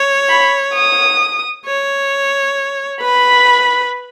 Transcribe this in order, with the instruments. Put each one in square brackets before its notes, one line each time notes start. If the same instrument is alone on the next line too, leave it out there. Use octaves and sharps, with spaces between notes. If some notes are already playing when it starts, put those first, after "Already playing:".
Already playing: [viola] C#5
[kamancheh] B5
D#6
[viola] C#5
[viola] B4 [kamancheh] B5